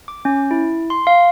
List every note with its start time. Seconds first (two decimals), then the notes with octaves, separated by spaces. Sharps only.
0.08 D6
0.25 C#4
0.51 E4
0.90 C6
1.07 F5